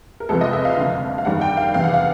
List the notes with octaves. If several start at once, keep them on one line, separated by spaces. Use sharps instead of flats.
A#4
C2 C3 F3 G#3 B3 A4
D#5
E5
F5
F#1 F2 D3
F5
G2 D#3 G3 A#3 F#5
G5
F5
F#1 E2 C3 D#3 F5
F#5
F5